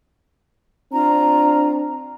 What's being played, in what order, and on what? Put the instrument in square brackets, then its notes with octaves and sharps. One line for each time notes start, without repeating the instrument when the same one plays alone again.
[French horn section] C4 D4 [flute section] F4 A#5